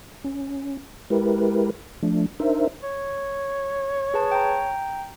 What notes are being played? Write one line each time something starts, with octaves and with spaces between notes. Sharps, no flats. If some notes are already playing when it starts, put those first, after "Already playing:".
C#4
G#3 E4 G4 A#4 B4
F3 A3 D4
D4 D#4 A#4 C5 E5
C#5
G#4 B4 A5
G5 A#5